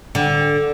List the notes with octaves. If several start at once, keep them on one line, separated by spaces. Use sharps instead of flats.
D3